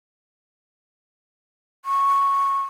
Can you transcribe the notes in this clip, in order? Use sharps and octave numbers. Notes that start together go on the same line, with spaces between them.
C#6